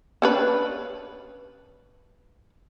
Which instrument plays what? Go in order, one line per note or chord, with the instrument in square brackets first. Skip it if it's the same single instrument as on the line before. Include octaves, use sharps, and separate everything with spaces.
[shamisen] C#4 D4 B4